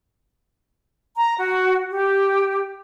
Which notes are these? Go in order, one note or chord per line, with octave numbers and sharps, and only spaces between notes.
A#5
F#4
G4